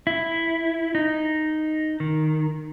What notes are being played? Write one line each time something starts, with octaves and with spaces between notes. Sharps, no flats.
E4
D#4
D#3